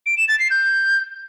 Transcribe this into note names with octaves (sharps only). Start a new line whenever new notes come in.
D7
E7
A6
C7
G6